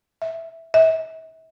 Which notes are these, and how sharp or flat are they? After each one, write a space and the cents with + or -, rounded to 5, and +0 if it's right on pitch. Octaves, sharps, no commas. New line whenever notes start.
E5 -5
E5 -40